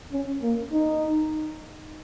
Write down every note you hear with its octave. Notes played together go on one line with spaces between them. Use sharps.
C#4
A#3
D#4